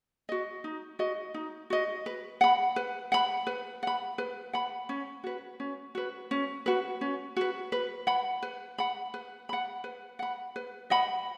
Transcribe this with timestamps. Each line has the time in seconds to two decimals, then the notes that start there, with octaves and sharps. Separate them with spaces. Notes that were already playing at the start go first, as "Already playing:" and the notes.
0.29 F#4 D#5
0.64 D#4
0.99 F#4 D#5
1.34 D#4
1.70 F#4 D#5
2.06 B4
2.41 F#5 B5
2.76 B4
3.12 F#5 B5
3.47 B4
3.83 F#5 B5
4.18 B4
4.53 F#5 B5
4.89 C#4
5.24 F#4 B4
5.60 C#4
5.95 F#4 B4
6.31 C#4
6.66 F#4 B4
7.01 C#4
7.37 F#4 B4
7.72 B4
8.07 F#5 B5
8.43 B4
8.78 F#5 B5
9.14 B4
9.49 F#5 B5
9.84 B4
10.19 F#5 B5
10.56 B4
10.90 D#5 F#5 B5